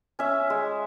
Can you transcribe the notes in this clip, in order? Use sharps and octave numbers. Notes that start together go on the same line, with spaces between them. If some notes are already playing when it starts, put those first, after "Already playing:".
C#4 E5
G#3